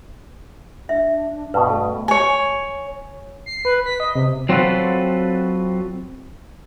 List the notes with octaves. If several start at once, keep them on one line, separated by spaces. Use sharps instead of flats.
D4 E5
G2 B2 B4
A3 A4
C#5 G#5
C7
B4
B6
D#5
C3
F#3 C4 F4 F#4 A4 B4